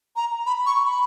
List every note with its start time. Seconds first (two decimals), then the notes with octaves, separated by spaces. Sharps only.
0.16 A#5
0.46 B5
0.66 C#6
0.85 B5